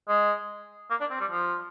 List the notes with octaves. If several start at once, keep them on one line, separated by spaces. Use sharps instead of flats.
G#3
A#3
D4
C4
G3
F3